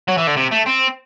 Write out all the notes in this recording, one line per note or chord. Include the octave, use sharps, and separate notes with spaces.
F#3
E3
D3
C3
A3
C4